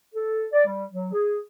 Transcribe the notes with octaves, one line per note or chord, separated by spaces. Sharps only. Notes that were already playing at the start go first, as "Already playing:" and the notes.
A4
D5
G3
F#3
G#4